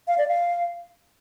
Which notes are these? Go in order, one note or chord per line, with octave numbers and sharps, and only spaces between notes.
F5
D5
F5